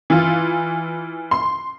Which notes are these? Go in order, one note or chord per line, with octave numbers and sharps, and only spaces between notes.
E3 F4
C6